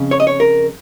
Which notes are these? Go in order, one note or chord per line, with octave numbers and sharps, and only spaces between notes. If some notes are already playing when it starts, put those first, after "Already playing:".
Already playing: F2 C#3
C#5
D#5
C#5
A#4